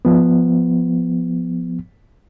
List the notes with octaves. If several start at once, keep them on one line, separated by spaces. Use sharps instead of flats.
F3 B3